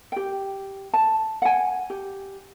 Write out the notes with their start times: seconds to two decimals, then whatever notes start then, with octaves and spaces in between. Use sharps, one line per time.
0.12 G4 G5
0.93 A5
1.42 F#5 G#5
1.90 G4